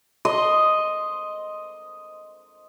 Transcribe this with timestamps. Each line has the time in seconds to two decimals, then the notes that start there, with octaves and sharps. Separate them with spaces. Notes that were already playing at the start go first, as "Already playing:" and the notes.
0.25 D#5 C6